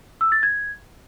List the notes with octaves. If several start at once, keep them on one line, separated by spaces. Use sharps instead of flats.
E6
A6
G#6